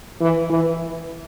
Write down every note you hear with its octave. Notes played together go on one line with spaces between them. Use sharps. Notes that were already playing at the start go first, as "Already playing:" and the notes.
E3
E3